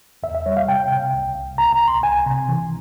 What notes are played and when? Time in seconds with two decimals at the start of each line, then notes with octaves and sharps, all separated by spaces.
0.23 E2 E5
0.35 E5
0.46 G3 C#5
0.57 F5
0.68 C3 G5
0.91 C3
1.13 C2
1.36 C2
1.58 C2 A#5
1.73 A#5
1.81 C2
1.88 C6
2.03 C2 G#5
2.26 C3
2.48 E3